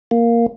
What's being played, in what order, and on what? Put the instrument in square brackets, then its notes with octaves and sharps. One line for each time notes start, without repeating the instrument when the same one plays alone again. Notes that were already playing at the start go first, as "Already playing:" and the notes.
[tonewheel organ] A#3